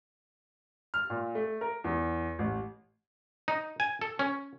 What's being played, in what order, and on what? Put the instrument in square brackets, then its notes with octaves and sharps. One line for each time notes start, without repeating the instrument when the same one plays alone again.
[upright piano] F6
A#2
A3
A#4
E2
A1
[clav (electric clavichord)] D#4
G#5
A4
C#4